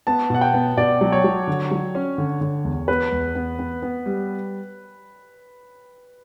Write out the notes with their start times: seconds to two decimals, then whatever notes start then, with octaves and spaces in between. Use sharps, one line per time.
0.07 B3 A5
0.30 B2 F#5
0.41 G5
0.54 B3
0.77 B2 D5
1.01 F#3
1.12 C#5
1.24 F#3
1.47 D3
1.71 F#3
1.95 C#4
2.18 D3
2.41 D3
2.65 E2
2.88 B3 B4
3.12 E2
3.35 B3
3.59 B3
3.82 B3
4.06 G3